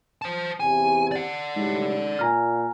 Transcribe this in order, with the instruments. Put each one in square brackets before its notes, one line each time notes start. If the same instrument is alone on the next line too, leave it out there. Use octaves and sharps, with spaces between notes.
[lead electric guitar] C5 A5
[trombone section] E2 C3 [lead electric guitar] G#5
[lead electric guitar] D5 F#5
[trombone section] A2 G3 [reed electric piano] G#3 D#4
[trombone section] A#2 [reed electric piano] G#5 A#5 F6